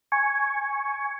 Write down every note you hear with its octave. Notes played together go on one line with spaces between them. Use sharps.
G#5 C#6